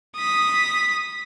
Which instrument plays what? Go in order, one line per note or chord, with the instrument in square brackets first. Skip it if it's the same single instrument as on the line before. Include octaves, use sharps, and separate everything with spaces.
[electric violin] D#6 B6